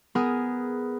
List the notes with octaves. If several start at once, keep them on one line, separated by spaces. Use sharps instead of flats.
B3 G#4 A#4